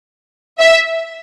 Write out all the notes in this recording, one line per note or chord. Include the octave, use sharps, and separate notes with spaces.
E5